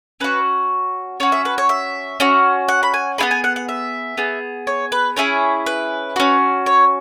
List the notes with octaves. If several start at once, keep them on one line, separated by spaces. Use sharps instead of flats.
C#4 F#4 B4
C#4 F#4 C#5
E5
B4
C#5
E5
C#4 F#4
F#5
B5
G#5
B3 E4 G#4 B5
G#5
F#5
F#5
E5
B3 G#4
C#5
B4
C#4 E4 G#4 C#5
B4
C#4 F#4
C#5